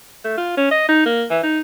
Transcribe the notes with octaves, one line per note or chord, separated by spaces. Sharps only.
A3
F4
C#4
D#5
D#4
A#3
E3
D#4